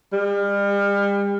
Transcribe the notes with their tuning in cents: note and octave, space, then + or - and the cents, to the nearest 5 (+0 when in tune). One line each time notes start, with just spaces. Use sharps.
G3 +40